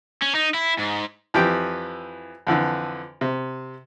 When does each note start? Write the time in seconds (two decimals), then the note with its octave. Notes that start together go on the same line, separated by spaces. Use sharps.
0.22 C#4
0.35 D#4
0.54 E4
0.78 G#2
1.34 F2 E3 G4 G5
2.47 F2 D3 E3
3.21 C3